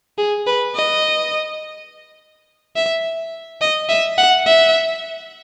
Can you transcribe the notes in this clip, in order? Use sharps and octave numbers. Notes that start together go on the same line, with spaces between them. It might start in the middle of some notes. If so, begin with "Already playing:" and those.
G#4
B4
D#5
E5
D#5
E5
F#5
E5